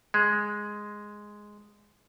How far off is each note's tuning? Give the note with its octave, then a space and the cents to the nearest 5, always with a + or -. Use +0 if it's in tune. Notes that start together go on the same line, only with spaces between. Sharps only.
G#3 +0